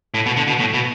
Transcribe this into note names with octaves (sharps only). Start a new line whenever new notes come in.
A2
B2
D3
B2
A2
B2